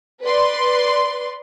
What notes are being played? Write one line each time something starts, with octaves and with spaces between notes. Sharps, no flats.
B4 D5 C6